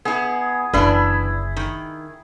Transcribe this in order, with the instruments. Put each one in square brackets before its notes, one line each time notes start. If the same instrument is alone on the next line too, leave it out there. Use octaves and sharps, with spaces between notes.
[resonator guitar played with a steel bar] B3 E4 [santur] G#4
[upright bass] F#1 D3 [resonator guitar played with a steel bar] E3 D4 B4 [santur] E4
[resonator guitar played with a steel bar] D#3